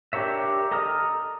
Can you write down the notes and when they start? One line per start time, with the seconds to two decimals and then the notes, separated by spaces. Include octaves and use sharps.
0.13 D4 G4 A#4 C#5 E5
0.71 A4 D#5 A#5 D#6 F6